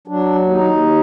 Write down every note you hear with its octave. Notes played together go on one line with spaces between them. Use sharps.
F#3 D4
D#2
D#4
D#2